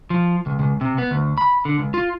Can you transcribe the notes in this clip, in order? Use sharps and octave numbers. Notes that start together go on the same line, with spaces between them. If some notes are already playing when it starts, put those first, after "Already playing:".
F3
C#2
C#2
C3
B3
D2
B5
D3
C#2
F4